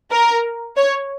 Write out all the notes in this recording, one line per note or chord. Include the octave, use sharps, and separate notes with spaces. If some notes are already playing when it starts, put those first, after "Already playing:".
A#4
C#5